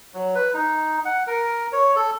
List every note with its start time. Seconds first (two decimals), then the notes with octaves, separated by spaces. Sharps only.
0.14 F#3
0.35 B4
0.54 D#4
1.05 F#5
1.27 A#4
1.73 C#5
1.96 A4